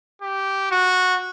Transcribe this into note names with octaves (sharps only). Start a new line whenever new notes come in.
G4
F#4